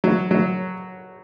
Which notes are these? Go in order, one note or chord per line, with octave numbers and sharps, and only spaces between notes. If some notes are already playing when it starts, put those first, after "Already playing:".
F#3
F#3